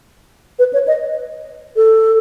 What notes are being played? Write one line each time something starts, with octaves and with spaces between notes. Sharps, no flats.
B4
C#5
D#5
A4